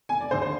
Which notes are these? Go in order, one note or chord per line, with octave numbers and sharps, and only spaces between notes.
F1 G#5
D5
D#2 D3 C5
C5